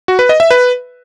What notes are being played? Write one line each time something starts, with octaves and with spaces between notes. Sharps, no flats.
F#4
B4
D#5
E5
B4